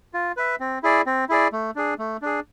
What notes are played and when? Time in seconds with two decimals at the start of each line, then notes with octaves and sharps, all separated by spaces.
0.14 F4
0.37 B4 E5
0.60 C4
0.83 E4 G#4 D5
1.06 C4
1.29 E4 G#4 D5
1.52 A3
1.76 D4 G#4
1.99 A3
2.22 D4 G#4